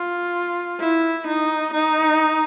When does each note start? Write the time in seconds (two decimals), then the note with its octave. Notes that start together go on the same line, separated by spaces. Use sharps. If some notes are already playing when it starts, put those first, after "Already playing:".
Already playing: F4
0.80 E4
1.27 D#4
1.74 D#4